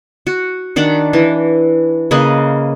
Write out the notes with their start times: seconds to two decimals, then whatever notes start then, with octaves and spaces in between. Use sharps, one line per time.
0.27 F#4
0.76 D#3 D4 F#5 D6
1.13 E3
2.11 C#3 A#3 B4 D#5